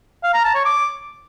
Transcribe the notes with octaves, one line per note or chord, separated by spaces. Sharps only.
F5
A#5
A5
C#5
D6